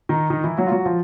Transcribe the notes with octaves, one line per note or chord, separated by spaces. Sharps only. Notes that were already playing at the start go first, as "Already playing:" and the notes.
D#3 D#4
D#3 D#4
E3 E4
F#3 F#4
F4
F#3 F#4
F3 F4